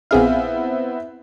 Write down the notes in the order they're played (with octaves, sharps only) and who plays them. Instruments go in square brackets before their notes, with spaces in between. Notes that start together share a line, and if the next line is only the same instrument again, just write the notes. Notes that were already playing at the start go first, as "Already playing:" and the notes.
[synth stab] A#1 G#4 F5 [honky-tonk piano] B3 C4 E4